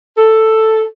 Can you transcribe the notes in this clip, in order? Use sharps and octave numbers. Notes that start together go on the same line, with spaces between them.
A4